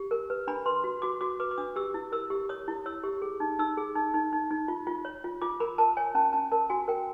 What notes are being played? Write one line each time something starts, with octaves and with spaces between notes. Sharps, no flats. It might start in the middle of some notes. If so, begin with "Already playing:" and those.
Already playing: G4
A#4
B4
D4 B5
B4 C6
F#4
F#4 D6
F#4 D6
B4 D6
D6
D4 D#6
G4 E6
E4
A#4 E6
G4
C#5 D#6
E4
C#5 E6
G4
G#4
D#4
D#4 E6
G#4
D#4
D#4
D#4
D#4
F4
F4
C#5
F4
F4 D6
A#4 B5
A#4 A5
C#5 G#5
C#4 A5
C#4 A5
A#4 A5
F#4 G#5
A#4 G5